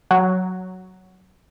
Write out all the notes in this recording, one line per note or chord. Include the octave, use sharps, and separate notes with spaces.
F#3